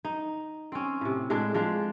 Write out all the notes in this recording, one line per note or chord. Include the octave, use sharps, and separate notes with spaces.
D#4
C4 C#4
A2 C3
A2 G#3 D4
F3 G#3 D4